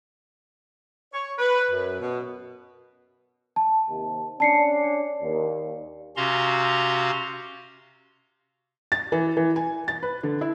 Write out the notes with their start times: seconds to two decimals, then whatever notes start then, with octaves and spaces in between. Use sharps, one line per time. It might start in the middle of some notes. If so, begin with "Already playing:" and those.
1.13 C#5
1.38 B4
1.71 F#2
2.00 B2
3.56 A5
3.89 D#2 C3
4.40 C#4 D4 A5 C7 C#7
4.84 D5
5.22 D#2
6.16 C3 C#4 F#4 F5 A#5 C6
8.92 A6
9.12 E3
9.37 E3
9.56 G#5
9.88 A6
10.03 B4
10.23 D3
10.41 E4